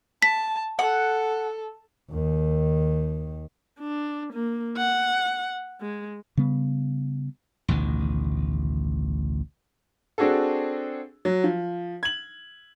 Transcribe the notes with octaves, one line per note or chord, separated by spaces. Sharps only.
A5 B6
A4 F#5
D#2 D#3
D4
A#3
F#5
G#3
C#3 G3 B3
A1 D2 B2 D#3
C4 D4 F#4 G#4 A4
F#3
F3
G#6 F#7